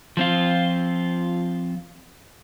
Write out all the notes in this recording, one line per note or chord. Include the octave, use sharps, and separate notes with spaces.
F3 C4 F4